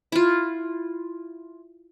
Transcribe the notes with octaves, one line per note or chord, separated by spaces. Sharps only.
E4 F4